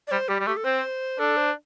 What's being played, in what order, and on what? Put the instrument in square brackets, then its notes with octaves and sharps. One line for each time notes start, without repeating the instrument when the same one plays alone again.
[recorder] D5
[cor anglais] G3 [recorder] C5
[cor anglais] G3 [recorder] G4
[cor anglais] G3
[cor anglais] A3 [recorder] G4
[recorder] A4
[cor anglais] C4 [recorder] C5
[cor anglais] D4 [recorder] A4
[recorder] C5